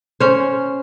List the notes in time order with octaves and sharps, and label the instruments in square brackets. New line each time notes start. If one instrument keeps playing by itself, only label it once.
[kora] C#4 C5